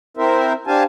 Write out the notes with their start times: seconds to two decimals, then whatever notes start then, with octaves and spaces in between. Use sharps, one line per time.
0.17 C4 E4 A#4 C5 E5
0.67 D4 G4 C5 F5 G#5 A5